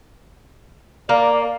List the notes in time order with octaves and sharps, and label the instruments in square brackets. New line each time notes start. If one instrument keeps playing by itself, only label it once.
[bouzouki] A#3 [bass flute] D5